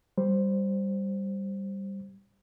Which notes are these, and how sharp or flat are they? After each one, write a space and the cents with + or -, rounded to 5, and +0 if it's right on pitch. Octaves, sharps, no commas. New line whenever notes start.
G3 +0 C5 +0